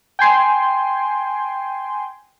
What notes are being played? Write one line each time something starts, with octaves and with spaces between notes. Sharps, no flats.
G5 G#5 C6